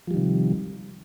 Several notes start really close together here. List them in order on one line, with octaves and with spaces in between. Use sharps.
F3 G3 D#3 C3